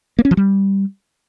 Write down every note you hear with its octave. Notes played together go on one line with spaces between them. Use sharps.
A#3
C#4
F3
G3